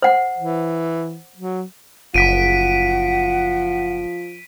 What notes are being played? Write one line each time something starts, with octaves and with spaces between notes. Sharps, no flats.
C5 F#5
E3
F#3
F#1 F3 F#5 B6 D7 D#7